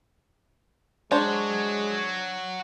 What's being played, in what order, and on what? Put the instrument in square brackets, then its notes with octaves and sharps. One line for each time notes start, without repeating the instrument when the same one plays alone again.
[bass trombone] G#3 [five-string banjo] D4 C5 [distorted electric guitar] F#4 C#5